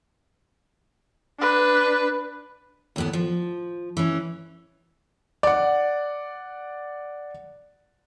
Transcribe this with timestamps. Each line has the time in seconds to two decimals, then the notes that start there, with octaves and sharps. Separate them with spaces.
1.39 D4 B4
2.96 D#2 A2 B3
3.13 F3
3.97 E3 C#4
5.43 D5 F#5